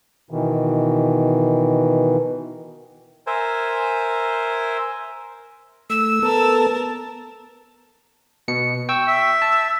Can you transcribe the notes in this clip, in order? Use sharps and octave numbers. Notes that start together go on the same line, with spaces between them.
B2 D#3 E3
A#4 C5 E5 G#5
A3 E6
B3 A4 A#4 A5
B2 C#7
G5 C#6 E6
E5
A5